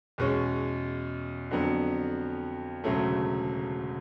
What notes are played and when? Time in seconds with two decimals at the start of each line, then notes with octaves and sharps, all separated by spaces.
0.18 E2 B2 G#3 C#4
1.51 F2 D3 F#3 B3
2.84 E1 D2 C#3 F#3 A3